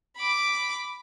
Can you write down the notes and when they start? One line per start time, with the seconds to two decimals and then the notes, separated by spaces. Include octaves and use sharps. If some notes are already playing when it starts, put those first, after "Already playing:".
0.17 B5 D6